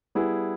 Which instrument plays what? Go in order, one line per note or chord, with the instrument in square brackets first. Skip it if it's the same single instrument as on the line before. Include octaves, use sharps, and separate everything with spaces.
[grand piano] G3 B3 E4 G#4